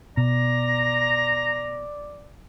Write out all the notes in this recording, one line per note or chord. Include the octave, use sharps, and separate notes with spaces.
B2 D5 A#5